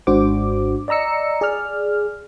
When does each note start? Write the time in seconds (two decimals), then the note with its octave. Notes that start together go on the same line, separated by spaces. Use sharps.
0.07 G#1 G#2 D4 F#4 C5 D6
0.88 D5 D#5 A#5 E6 C#7
1.41 G#4 D5 F6